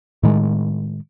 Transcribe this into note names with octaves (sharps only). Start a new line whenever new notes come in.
A2 D#3 G#3